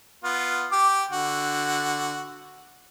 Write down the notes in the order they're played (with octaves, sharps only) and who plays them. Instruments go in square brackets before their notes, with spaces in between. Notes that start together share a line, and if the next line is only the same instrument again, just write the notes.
[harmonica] B3 F4
G4 D6
D3 F#4